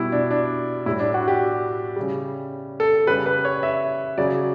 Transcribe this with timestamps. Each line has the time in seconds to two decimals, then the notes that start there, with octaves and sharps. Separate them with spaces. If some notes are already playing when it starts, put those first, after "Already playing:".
Already playing: B2 G3 E4
0.12 D4
0.31 D4
0.86 A2 G3 E4
1.00 D4
1.14 F#4
1.28 G4
1.96 C#3 G3
2.80 A4
3.07 C#3 G3 B4
3.26 B4
3.45 C#5
3.63 E5
4.18 C#3 F#3 D5